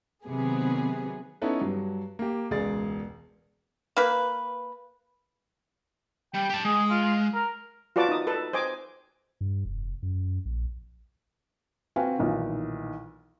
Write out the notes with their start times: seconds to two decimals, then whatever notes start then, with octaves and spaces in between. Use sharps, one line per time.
0.24 C3 D#3 F#3 B3 G#4
1.42 B3 C#4 D#4 E4 A4 B4
1.61 G2 F#3
2.19 A#3 G4
2.51 E1 C#2 G#4 D5 A6
3.97 A#3 B4
6.34 G3 G5
6.49 G4 A5
6.65 G#3 G#4
6.90 F4
7.34 A#4
7.96 F4 F#4 B4 D5 A5 D6
8.09 D#4 D#6
8.27 A4 B4 A5
8.53 C5 D#5 G#5 D6
9.41 G2
9.65 F1
10.03 F#2
10.45 A#1
11.96 C4 F#4 B4 F5 G5 G#5
12.18 B1 A#2 D#3 E3